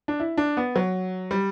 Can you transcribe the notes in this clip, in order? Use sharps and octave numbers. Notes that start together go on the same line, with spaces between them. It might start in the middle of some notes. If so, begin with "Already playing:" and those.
D4
E4
D4
B3
F#3
G3